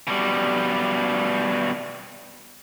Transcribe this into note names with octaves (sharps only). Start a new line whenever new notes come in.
B2 G3